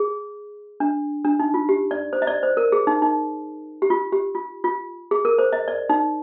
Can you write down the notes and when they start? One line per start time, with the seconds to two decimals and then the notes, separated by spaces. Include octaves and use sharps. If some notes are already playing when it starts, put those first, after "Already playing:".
Already playing: G#4
0.80 D4
1.25 D4
1.39 D#4
1.54 F4
1.69 G4
1.91 D5
2.13 C5
2.22 D#5
2.27 D5
2.43 C5
2.57 A#4
2.72 G#4
2.87 D#4
3.02 D#4
3.82 G4
3.90 F4
4.12 G4
4.35 F4
4.64 F4
5.11 G#4
5.25 A#4
5.39 C5
5.52 D#5
5.68 D5
5.89 D#4